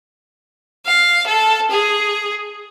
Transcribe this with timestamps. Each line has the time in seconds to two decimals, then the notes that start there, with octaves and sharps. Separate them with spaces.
0.86 F5
1.26 A4
1.71 G#4